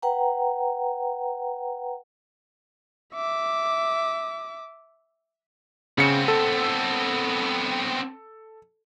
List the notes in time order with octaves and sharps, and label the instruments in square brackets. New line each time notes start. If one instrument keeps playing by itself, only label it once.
[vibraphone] B4 F#5 G5 A#5
[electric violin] E5 D6
[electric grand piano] C#3 C#7 [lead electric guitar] B3 C4
[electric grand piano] A4